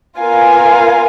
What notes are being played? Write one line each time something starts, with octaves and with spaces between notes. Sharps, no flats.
B3 F4 A#4 F5 G#5